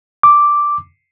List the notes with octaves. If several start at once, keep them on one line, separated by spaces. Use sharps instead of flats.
D6